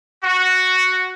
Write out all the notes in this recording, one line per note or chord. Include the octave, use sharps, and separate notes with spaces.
F#4